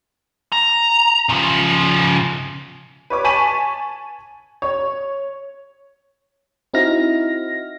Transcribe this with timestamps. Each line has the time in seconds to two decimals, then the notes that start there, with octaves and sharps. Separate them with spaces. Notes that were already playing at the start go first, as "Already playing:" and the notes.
0.52 A#5
1.29 C#3 F3
3.10 B4 C#5 D6
3.24 G#5 A5 C#6 B6 D#7 F#7
4.62 C#5
6.74 C4 D#4 E4 F#4 F6 A#6